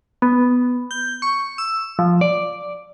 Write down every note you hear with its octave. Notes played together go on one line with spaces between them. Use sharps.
B3
G6
C#6
E6
F3
D5